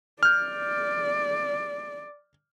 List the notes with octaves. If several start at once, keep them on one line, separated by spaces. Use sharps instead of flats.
D5 F6 G6